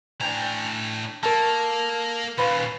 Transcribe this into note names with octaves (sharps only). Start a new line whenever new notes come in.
A2 D4 G5 G#5 A#5
A#3 A4 A#4 A5 C#6
D#2 A#2 C#4 F4 B4